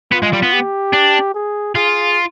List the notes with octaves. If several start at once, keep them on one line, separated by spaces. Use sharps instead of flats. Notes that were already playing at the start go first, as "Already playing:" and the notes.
B3 F4
G#3
G3
B3
G4
D4
G#4
F4 G#4